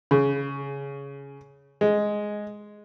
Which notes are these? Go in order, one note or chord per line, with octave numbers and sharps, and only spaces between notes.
C#3
G#3